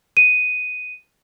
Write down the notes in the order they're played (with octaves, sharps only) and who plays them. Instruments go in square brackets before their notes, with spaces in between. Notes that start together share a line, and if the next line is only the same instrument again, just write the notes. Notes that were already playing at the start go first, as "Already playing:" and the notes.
[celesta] D#7